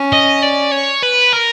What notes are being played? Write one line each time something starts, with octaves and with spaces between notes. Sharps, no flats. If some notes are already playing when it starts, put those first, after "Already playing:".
Already playing: C#4
D#5
D5
C#5
B4
A#4